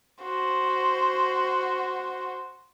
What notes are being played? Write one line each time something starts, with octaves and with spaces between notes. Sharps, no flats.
F#4 C5